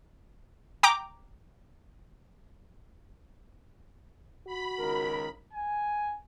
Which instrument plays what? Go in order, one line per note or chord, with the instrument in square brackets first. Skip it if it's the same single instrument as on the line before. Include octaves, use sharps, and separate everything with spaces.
[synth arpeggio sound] G5 A#5 D6
[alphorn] F#4 [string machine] B5
[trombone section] C#2 D#3 A#4
[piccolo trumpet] G#5